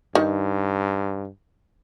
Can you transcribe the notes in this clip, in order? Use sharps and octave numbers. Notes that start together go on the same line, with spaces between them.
G2 D#3